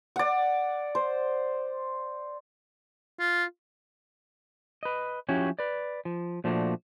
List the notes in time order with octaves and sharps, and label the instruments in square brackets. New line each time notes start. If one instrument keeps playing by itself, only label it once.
[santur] D5 F#5
C5
[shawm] F4
[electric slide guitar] B4 D#5
F3 C#4 E4 F#4 G4 C#5
B4 D5
F3
A#2 F3 A3 D4 F#4